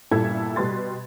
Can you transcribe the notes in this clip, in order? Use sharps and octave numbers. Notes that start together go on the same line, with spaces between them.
G1 A#2 G3 E4 A4 G#6
B2 G3 B4 C6 A6